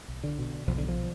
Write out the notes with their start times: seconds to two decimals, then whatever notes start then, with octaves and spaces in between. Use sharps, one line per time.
0.08 B1
0.24 D3
0.39 B2
0.67 B1 F3
0.78 D3
0.88 F3